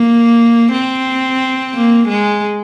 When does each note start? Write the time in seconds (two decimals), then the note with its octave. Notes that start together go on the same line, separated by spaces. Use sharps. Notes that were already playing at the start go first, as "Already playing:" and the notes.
Already playing: A#3
0.72 C4
1.74 A#3
2.08 G#3